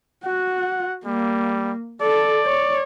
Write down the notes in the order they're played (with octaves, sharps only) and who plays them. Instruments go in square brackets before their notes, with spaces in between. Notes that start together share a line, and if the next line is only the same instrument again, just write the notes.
[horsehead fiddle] F#4 [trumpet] F#5
[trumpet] G3 [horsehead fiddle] A#3
[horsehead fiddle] A4 [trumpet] D5
[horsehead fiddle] C#5